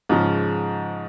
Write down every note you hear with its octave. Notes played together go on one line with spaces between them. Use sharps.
G#2 C#3 F3